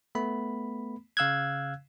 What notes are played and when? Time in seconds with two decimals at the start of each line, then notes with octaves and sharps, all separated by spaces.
0.15 A3 B3 B5
1.17 C#3 F5 E6 F#6 G#6